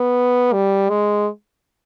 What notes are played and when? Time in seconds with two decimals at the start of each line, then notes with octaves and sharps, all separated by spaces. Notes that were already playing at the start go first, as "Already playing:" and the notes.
Already playing: B3
0.53 G3
0.90 G#3